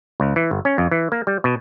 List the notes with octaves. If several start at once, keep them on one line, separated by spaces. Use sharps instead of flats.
C#2
E3
G1
C#4
F2
E3
A#3
G3
B2